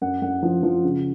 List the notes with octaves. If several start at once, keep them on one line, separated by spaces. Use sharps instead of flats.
F#2 F#5
F#2 F#5
F3
F3
C#3